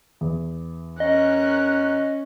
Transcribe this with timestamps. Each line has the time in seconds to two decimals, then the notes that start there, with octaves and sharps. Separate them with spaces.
0.21 E2
1.00 C#4 A#4 D#5 F#6